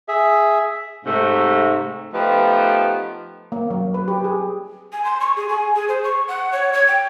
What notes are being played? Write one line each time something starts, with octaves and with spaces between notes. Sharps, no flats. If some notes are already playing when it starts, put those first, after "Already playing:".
G#4 E5
G#2 C3 A3
F3 A3 B3 D#4 G4 B4
A#3
F#3
B4
G4
G#4
G#5
C6
C#6
G#4
G#5
G#4
C5
C#6
F#5
C#5
G#6
G5